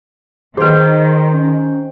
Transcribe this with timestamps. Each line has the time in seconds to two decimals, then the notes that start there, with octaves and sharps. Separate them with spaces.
0.57 D#3 G#4 B4 C5 G5
1.32 C#4